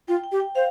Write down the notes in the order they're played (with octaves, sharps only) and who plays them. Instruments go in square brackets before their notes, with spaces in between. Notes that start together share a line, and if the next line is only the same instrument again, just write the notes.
[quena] F4 [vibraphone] G5
[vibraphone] G5
[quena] G4
[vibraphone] G5
[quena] C5 [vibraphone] F5